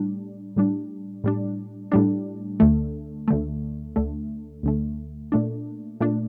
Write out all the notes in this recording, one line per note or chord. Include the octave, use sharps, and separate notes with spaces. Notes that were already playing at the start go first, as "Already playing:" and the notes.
Already playing: A2 G3 D4
A2 G3 D4
A2 G3 D4
A2 G3 D4
D2 D3 A3
D2 D3 A3
D2 D3 A3
D2 D3 A3
A#2 A3 D4
A#2 A3 D4